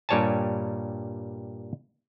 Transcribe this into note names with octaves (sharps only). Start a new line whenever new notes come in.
G2 A#2 G3 C#5 G#5 A5